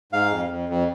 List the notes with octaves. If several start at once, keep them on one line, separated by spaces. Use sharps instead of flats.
G#2 F5
F2
F2
F2